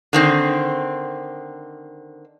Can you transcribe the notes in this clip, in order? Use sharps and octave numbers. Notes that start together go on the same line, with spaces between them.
D3 D#3 C4